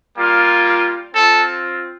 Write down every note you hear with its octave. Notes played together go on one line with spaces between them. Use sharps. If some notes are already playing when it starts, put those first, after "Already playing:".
G3 A#3 F4
C4 F4 A4